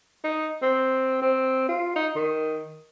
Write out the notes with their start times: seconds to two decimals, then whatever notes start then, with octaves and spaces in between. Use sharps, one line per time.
0.24 D#4
0.63 C4
1.22 C4
1.69 F4
1.96 D#4
2.16 D#3